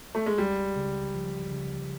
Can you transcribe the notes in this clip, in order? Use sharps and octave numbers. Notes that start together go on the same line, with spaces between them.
A3
G#3
C#2 G3
C#3
F3
C#3